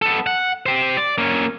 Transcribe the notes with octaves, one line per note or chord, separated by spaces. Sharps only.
B3 A4
F#5
G4 C5
D5
A#3 C#4